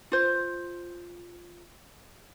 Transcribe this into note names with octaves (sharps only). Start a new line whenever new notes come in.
F4 C5